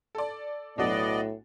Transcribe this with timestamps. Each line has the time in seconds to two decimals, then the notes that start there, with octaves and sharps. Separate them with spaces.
0.15 A4 D5
0.78 B1 A2 F#3 B3 D4 F#4 D5 D#5